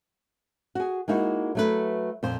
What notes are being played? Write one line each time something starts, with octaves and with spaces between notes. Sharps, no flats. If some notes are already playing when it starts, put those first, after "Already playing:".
F#4 G#4
G#3 A#3 D#4 E4 F#4
F#3 A3 B4
F2 A#2 C5